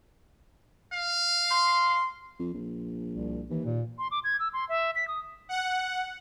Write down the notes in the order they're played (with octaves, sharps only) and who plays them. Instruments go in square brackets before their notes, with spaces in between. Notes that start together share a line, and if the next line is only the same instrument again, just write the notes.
[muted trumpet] F5
[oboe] C6
[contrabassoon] F2
A#1
[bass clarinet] C2
[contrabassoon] D#2 [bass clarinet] E3
[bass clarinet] A#2
[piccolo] C6
D6
G#6
E6
C6
E5
B6
D#6
[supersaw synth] F#5